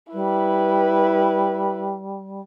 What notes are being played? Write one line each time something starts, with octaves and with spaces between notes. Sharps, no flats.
G3 E4 B4